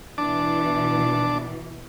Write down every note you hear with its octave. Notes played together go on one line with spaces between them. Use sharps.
B2 E3 D4 A5 D6